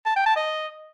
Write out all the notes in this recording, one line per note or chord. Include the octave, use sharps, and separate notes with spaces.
A5
G5
A5
D#5